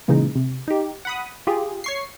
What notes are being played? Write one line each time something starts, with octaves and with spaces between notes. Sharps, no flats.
A#2 C#3 E3 G#3 D#4
C3
D#4 G4
F#5 B5 D#6
F4 G4 G#4
C#5 C#6 C7